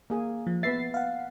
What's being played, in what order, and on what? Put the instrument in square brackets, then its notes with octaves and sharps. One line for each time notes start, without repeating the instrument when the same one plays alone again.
[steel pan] A#3 G#4 G#5
[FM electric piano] F3
[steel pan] B3 B4 E5 [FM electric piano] A6 C7
[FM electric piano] F5 F#5